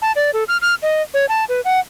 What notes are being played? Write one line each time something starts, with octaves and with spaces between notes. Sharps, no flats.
A5
D5
A4
F6
F6
D#5
C#5
A5
B4
F#5